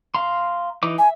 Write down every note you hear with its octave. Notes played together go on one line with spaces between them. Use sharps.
F5 A#5 C6
E3 D#4 D6
E5 G#5